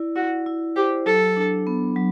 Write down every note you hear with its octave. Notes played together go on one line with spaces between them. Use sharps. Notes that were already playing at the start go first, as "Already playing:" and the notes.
Already playing: E4 D5
E4 F#4
E4
G4 C5
F#3 A4
D4
B3
F#3